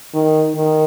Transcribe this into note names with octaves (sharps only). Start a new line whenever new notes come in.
D#3
D#3